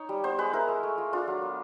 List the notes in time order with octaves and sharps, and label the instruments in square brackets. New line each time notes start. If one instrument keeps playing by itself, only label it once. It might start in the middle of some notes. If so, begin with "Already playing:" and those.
Already playing: [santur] D#4 C#5
G3
B3 C5
G#3 B4
E4 A#4
G#3
A3
F4
D4 F4
F#3
B3